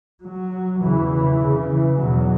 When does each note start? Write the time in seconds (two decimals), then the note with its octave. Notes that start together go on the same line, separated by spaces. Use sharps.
0.25 F#3
0.83 E2 C#3 E3
1.12 E3
1.42 C#3
1.70 E3
1.99 E2 B2 F#3